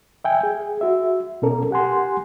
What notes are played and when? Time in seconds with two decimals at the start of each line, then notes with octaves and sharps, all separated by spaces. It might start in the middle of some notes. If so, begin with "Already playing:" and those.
0.24 E5 G5 G#5
0.43 G#4
0.81 F#4 E5
1.42 B2 C#4 A4 A#4
1.71 G4 F#5 G#5 C6